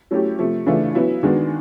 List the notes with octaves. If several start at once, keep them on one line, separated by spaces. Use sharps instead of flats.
F#3 A3 C#4 E4 G4
C3 F3 A3
C#3 E3 A3 D4 F4
F#3 B3 E4
D#3 G#3 B3 D4 F#4